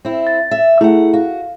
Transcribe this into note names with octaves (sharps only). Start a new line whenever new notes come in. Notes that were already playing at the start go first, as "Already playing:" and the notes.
C4 E4
A6
E5
A3 E4 G#4 F#5
F#4 F5